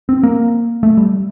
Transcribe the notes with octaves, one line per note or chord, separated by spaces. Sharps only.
C4
A#3
A3
G3